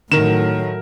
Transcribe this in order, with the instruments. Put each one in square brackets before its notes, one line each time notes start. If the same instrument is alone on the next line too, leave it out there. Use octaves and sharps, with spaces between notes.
[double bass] A2 F#3 [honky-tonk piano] D#3 [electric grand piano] A#4 E7